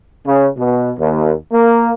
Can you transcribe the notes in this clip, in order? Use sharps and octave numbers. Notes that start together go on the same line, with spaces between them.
C#3
B2
D#2
A#3